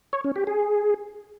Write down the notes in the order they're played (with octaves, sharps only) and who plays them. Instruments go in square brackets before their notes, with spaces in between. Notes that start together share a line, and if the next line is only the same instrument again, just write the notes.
[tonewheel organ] C#5
C#4
G4
G#4